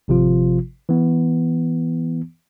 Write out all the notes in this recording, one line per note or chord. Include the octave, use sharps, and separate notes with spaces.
G#1 C3 F3 F4
E3 B3